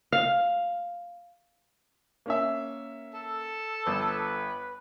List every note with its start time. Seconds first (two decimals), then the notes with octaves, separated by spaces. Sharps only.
0.12 F5
2.26 A#3 C#4 E5
3.14 A4
3.87 G1 B4